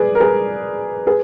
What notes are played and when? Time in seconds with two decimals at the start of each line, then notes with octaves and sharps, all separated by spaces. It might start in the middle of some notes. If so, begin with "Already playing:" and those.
Already playing: G#4 B4 D5
0.15 A#4
0.20 G#4 B4
1.07 G#4 B4